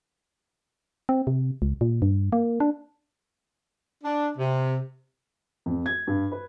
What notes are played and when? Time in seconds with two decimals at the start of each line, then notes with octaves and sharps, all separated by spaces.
1.09 C4
1.27 C3
1.62 C#2
1.81 A#2
2.02 G2
2.32 A#3
2.60 D4
4.04 D4
4.37 C3
5.66 F2
5.86 G#6
6.07 G2
6.32 B4